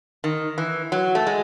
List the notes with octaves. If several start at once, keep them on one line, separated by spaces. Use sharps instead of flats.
D#3
E3
F#3
A3
G#3